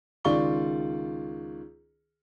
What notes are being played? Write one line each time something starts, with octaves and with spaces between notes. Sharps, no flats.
C#2 D#3 F4 D5 C#6 G7